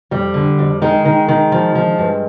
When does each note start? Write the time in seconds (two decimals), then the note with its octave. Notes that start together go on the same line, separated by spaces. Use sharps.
0.11 F2 G3
0.34 D3
0.59 F2
0.82 D#3 G#3
1.05 D#3
1.28 D#3
1.52 F3
1.75 F3
1.98 G2